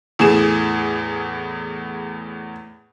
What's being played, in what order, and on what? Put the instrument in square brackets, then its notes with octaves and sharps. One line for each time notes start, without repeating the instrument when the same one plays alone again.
[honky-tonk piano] E2 A2 G#4 E7